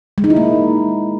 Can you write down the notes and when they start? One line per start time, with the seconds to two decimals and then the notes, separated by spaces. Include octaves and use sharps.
0.18 G#3
0.24 D#4
0.30 E4
0.36 A#3